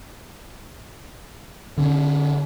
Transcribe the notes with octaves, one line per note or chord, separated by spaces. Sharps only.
D3 C#4